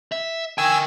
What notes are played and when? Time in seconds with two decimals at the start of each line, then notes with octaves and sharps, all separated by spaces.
0.12 E5
0.58 A#4 G5 G#5 E6